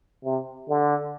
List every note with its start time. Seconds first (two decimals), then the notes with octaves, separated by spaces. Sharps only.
0.24 C3
0.68 D3